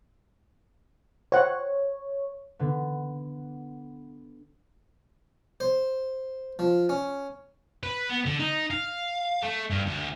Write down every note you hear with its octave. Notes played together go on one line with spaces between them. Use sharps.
C5 C#5 F#5
D3 B3
C5
F3
C#4
B4
B3
D3
D#4
F5
A3
G2
D2